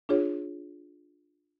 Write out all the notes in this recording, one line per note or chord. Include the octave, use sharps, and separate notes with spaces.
D4 F4 G#4 C#5